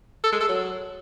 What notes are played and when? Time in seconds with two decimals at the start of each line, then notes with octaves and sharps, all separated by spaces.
0.24 A4
0.32 G#3
0.41 A4
0.49 F#3